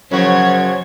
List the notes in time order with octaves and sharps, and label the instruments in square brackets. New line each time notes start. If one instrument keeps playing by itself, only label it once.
[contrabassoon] F#2 [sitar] C#3 F#4 [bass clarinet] F3 [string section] C5 C#5 G#6